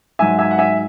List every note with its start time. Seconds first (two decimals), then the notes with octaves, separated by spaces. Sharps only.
0.19 G#2 F#3 E5 G#5
0.39 E5 G#5
0.51 F#5
0.58 E5 G#5